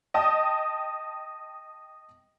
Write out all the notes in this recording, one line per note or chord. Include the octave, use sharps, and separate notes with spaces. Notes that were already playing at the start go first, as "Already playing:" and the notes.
D#5 G5 A5 D#6